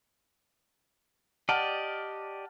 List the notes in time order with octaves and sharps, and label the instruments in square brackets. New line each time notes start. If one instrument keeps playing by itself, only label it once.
[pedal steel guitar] G4 D5 D#5 [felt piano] F#5 A5 F6